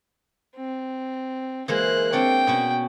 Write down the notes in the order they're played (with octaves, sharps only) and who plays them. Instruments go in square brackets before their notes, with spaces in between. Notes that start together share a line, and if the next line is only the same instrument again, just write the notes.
[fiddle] C4
[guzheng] E3 G#3 A#3 [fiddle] C5 F#6
[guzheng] C4 D4 C#5 [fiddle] G5
[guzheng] B2 C#4 F#4